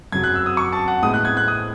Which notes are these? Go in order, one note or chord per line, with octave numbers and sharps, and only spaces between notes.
F#2 C#3 F#3 G#6
F#6
E6
D#6
C#6
A5
F#5
A2 G#3 B3 D#6
F#6
G#6
F#6
D#6